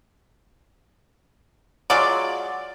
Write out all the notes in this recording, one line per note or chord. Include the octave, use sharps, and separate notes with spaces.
F#3 G#3 F4 D5